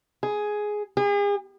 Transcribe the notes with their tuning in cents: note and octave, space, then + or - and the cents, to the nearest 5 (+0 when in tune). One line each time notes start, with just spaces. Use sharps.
G#4 +5
G#4 -40